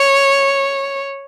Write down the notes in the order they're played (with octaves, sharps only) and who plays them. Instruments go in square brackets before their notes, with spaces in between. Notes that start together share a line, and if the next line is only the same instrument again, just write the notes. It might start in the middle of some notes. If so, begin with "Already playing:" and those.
Already playing: [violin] C#5